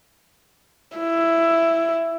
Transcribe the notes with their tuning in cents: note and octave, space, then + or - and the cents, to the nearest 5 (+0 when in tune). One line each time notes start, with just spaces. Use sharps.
E4 +10